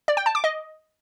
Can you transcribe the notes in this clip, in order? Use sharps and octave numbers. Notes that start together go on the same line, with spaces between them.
D5
G5
A5
D6
D#5